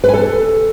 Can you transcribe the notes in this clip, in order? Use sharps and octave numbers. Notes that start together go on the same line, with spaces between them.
B4
G#5
A4